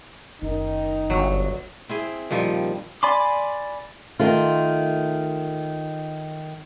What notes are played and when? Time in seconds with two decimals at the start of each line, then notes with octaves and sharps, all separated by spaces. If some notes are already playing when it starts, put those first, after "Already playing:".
0.42 F#1 D#3 D#4
1.10 G1 F#3
1.89 C4 E4 G#4
2.31 A#2 D#3 F3 G3
3.03 D5 G#5 B5 C6 D6
4.19 D#3 A3 F4